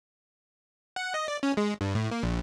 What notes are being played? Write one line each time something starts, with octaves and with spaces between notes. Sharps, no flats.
F#5
D#5
D5
C#4
G#3
G2
A2
A#3
A#1